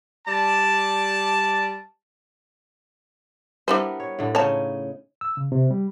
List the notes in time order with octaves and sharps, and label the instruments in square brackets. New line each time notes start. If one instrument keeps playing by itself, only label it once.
[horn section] G3 D5 A5
[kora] G3 B3 A#4 [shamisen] D4 E4 C5
[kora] C#5
A2 D3
[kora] C#3 C#4 D#4 [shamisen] C#5 A5
[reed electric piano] E6
C#3
C3
G3